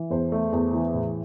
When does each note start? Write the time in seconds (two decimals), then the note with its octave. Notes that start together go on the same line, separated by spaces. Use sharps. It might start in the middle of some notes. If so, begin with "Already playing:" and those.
Already playing: E3
0.10 E2 C5
0.32 A3
0.52 E2
0.73 E3
0.94 A2